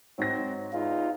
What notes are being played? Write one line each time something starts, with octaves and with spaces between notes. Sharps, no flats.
G#2 F#3 C4 A#6
E2 D#4 F4